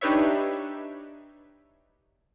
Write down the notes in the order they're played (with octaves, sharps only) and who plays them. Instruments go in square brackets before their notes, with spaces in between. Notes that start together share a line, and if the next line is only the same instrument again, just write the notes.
[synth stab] D4 D#4 G4 B4 C#5 E5